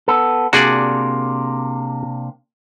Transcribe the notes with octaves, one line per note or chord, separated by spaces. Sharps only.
B3 A4
C3 A#3 D4 F#4 G#4 D5